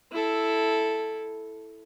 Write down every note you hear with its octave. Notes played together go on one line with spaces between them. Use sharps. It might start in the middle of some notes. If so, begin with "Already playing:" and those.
E4 A4